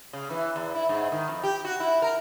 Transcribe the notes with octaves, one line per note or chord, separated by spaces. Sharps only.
C#3
E3
E2
E4
G#2
D#3
F2
G4
F#4
E4
A#4